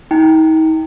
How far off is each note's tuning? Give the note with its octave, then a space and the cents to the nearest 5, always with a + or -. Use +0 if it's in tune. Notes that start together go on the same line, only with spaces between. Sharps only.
D#4 +40 G5 +0